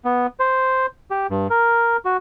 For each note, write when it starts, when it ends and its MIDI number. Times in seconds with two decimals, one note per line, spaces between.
0.05 0.27 59
0.40 0.86 72
1.11 1.27 67
1.30 1.47 43
1.50 1.97 70
2.05 2.17 66